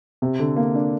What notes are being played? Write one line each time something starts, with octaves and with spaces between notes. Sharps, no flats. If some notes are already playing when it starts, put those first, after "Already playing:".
C3
D3
A#3
D4